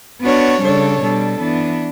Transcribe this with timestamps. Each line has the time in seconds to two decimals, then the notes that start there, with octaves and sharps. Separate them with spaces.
0.21 B3 D4 F#4 C#5
0.60 C#3 G3 D4 A4 C#5
1.00 B2 G3 D4 A4
1.40 E3 B3 D4